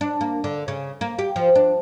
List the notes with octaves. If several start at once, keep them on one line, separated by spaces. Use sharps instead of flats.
D4
A#3
D3
C#3
A#3
G4
F3
D4